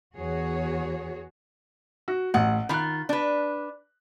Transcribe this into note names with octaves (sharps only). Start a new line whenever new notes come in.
E2 F#4 G#4 C#5
F#4
A1 F#5
D#3 F4 B5 F#6
D4 B4